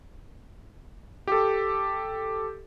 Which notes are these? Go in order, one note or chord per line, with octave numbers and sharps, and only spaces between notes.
G4 A4